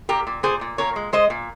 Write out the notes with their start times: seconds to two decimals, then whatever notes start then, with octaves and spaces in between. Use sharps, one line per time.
0.09 A#2 G4 A#4
0.27 A#2
0.43 A#2 G#4 C5
0.61 A#2
0.78 A#2 A#4 C#5
0.96 G#3
1.13 G#3 C5 D#5
1.30 A#2